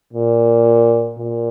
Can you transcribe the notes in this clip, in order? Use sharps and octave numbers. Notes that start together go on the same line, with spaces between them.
A#2
A#2